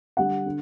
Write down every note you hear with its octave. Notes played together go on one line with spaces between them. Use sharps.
D3 G3 F#5
D3